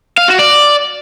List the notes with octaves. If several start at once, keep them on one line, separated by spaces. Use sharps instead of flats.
F5
F#4
D5